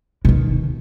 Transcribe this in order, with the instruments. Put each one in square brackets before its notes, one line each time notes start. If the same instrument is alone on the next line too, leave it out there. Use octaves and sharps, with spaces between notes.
[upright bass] B2 D#3